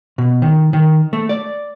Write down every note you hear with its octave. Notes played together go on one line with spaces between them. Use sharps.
B2
D#3
D#3
A3
D5